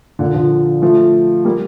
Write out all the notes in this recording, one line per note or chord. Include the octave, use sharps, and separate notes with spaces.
A#2 D3
D3 F3
F3 A3
G3 A#3